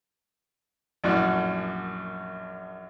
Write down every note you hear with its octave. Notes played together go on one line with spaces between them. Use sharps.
A#1 F#2 A2 F#4 D5